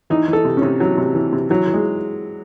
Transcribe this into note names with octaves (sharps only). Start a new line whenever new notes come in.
E3 D#4
E3
A4
C3
C3 C#4
E3 F#3
C3
E3
C3
E3 F#3
E3
G#3